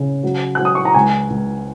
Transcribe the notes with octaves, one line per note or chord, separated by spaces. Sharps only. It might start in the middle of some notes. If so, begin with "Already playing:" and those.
Already playing: C#3
F#3
F#3 F#6
D#6
C#6
A#5
C#2 G#5
C#2